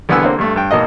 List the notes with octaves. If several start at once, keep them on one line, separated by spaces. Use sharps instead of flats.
C2 D3 B3 F#5 G#5 E6
D3 A#3 C4
G2 A3
G2 G5
G#1 B2 A#3 D#5